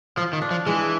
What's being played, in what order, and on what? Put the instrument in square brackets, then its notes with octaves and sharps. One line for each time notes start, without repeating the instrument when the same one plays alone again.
[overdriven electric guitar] F3 [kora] F4
[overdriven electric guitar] D#3
[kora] D4
[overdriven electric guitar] F3
[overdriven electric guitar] E3 [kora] G#3